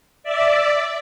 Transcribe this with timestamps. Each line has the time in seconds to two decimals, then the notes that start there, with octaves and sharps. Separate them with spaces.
0.23 D5 E5